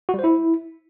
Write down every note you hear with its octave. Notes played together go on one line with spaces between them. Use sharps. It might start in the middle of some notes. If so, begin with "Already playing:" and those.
F#4
G3
C5
E4